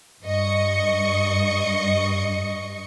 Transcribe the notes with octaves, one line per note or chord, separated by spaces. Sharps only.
G2 D#5 C#6 C#7